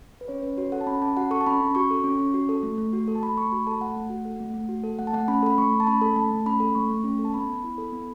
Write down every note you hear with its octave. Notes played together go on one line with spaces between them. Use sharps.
B4
C#4 C#5
C#4 B4
F#4 C#5
A4 F#5
A5
C#4 B5
C#4 A5
F#4 F#5
A4 C#6
A5
C#4 B5
C#4
F#4 C#6
A4
C#4
C#4
F#4
A4
A3
A3
F#4
A4
A5
A3 B5
A3 C#6
F#4 B5
A4 A5
A3 F#5
A3
F#4
A4
A3
A3
F#4
A4
A3 F#5
A5
A3 F#5
C#4 B5
A4 B5
A3 C#6
A3
A5
C#4 B5
A4
A3 A5
A3
C#4 B5
A4
A3 C#6
A3
C#4
A4
A5
B3 B5
B3
E4
A4
B3